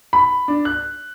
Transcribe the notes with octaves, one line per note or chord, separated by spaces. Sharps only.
B5
D4
F#6